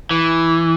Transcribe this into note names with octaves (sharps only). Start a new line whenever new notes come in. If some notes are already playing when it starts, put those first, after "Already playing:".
E3